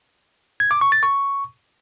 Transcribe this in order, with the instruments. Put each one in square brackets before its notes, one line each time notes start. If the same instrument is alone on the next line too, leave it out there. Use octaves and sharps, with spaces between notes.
[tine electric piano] G#6
D6
C#6
A6
C#6